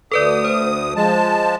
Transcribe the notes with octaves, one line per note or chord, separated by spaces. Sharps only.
D2 A4 B4 D5 D#6
C5
F3 G#3 A5